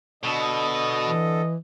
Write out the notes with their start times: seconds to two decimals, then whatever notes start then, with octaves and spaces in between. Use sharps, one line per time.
0.23 B2 D3 A4 D#5
1.05 E3